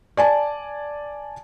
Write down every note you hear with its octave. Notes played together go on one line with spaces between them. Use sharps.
D5 G#5 A5